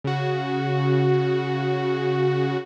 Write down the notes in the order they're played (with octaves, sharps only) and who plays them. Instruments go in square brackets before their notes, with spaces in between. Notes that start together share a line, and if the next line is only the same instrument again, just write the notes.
[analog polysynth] C#3 F#4